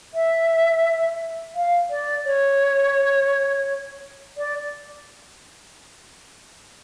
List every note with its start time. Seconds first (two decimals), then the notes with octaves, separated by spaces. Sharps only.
0.14 E5
1.55 F5
1.90 D5
2.26 C#5
4.38 D5